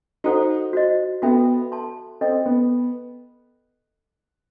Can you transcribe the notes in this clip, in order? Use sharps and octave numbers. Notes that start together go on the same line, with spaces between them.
D#4 F#4 A4 C5 F#5
F#4 C5 D#5
B3 F#4 A4 E5 G5
A4 E5 A5 C6
C4 A4 D#5 G5
B3